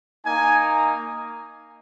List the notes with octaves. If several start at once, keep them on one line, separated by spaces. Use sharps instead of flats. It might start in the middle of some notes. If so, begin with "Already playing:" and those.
A#3 D#4 G#5